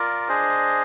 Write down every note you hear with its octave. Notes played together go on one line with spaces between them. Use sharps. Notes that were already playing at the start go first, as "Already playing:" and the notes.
Already playing: F4 A#4 D5
D4 G#4 C5 D#5